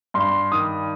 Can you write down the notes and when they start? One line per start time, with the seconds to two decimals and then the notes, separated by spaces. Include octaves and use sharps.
0.14 G2 C6
0.52 D#3 D#6